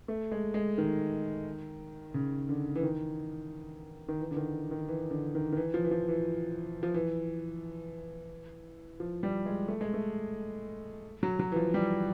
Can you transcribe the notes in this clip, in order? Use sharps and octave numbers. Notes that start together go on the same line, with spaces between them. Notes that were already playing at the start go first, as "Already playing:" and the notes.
A3
G#3
G#3
D#3
C#3
D3
E3
D#3
D#3
E3
D3
D#3
D#3
E3
D3
D#3
D#3
E3
F3
E3
F3
E3
F3
E3
F3
G3
G#3
A3
G#3
A3
F#3
F#3
E3
F3
G3